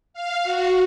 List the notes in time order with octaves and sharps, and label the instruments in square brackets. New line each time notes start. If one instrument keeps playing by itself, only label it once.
[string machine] F5
F#4